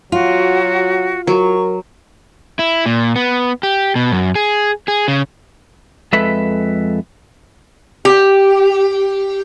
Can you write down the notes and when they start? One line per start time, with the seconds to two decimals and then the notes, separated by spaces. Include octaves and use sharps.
0.12 F#3 F4 F#4
1.27 F#3 A#4 C#6
2.59 E4
2.86 A#2
3.16 B3
3.63 G4
3.96 B2
4.12 F#2
4.35 G#4
4.88 G#4
5.08 C#3
6.13 F2 G#3 A4 B4 E5
8.05 G4